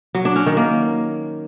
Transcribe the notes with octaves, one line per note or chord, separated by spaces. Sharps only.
F#3
D4
C#4
D#3
A#3